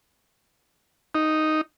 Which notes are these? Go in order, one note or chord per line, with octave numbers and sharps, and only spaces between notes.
D#4